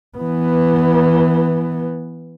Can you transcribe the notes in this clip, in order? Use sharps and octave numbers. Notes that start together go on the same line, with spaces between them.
E3 B3